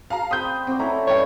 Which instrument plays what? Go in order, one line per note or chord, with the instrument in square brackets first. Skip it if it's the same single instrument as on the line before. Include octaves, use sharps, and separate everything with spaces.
[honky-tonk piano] F5 A5 A#5
[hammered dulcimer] C4 C5 B5 [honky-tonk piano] D#6 G6
[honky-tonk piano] C4 [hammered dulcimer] F#4 D6
[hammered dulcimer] C#4 E4 A4 [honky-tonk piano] A#5
[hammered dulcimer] G2 B4 G5 [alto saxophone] C#5